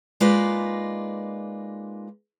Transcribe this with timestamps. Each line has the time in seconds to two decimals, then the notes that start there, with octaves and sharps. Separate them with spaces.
0.20 G#3 A#3 D#4 F4 B4 D5